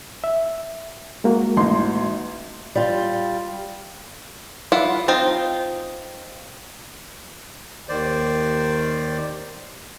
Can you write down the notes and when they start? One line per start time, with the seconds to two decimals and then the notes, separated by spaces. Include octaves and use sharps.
0.24 E5
1.24 G#3 A#3 F#4
1.57 A1 D#4 C6
2.75 G3 F4
4.72 E4 F4 F#5
5.08 C4 D#4 F4
7.89 D#2 D#3 C5 D5